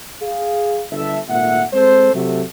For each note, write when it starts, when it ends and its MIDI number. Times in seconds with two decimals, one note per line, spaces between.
0.22 0.82 68
0.22 0.82 77
0.91 1.19 31
0.91 1.19 69
0.91 1.19 76
1.28 1.62 32
1.28 1.62 46
1.28 1.62 57
1.28 1.62 76
1.28 1.62 78
1.72 2.13 56
1.72 2.13 60
1.72 2.13 69
1.72 2.13 72
2.14 2.42 48
2.14 2.42 54
2.14 2.42 57
2.14 2.42 66
2.14 2.42 69
2.14 2.42 76